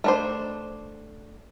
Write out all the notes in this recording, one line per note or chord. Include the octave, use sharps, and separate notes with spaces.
A3 D4 C5